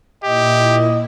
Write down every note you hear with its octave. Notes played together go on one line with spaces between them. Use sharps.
A#2 E4 G4 D#5